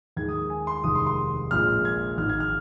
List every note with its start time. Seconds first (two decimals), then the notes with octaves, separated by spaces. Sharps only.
0.17 D#2 D#3 G#3 G#6
0.28 D#6
0.50 G#5
0.67 C6
0.84 F1 D#2 D#3 G#3 D#6
0.95 C6
1.06 C6
1.50 A#1 A#2 G#3 F6
1.85 G#6
2.18 G#1 G#2 D#3 F6
2.29 G#6
2.40 F6